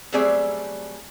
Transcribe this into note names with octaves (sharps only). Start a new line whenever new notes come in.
F#3 G3 A3 C4 G#4 D5